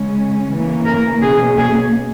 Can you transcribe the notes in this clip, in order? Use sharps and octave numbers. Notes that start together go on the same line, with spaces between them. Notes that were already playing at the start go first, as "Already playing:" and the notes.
Already playing: C#3 G#3 C#4
C#3 E3 A#3 C#4
A#4
B2 A#3 C#4 G#4
G#4